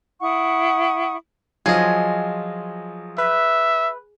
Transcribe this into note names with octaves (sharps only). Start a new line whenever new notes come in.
E4 F#5 C#6 D#6
F3 F#3 F4 G#4 D#5
B4 E5